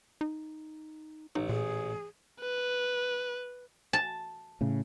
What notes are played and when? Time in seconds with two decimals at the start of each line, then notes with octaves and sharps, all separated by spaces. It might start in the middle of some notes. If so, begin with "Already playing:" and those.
0.21 D#4
1.36 A1 D#4
1.49 A#2 G#4
2.40 B4
3.93 A5
4.61 A2 C#3